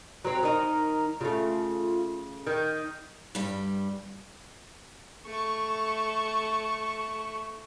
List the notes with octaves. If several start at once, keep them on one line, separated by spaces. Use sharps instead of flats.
F#3 C4 A#5
D#3 D#4
C#3 A3 F4
D#3 G6
G2 G3
A3 C#6